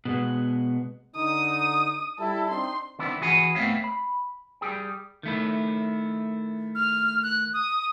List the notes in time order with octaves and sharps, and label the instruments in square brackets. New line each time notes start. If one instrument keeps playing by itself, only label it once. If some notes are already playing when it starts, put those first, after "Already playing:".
[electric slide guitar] B2 G#3 B3
[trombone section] D3 D#4 [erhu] D#6
[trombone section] G3 E4 [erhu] A4
[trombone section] C4 D4 D#4 [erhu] C6
[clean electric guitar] D#3 B3 C4 D4 E4
E3 F#4 G#4 F#5 G#5 B5
A3 B3 C4 C#5 E5 F5
B5
G3 G#4 G5
D#3 A3 E4
[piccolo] F6
F#6
D#6